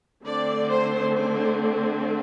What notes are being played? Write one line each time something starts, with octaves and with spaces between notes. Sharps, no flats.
D3 A3 C4 D5
C5
C5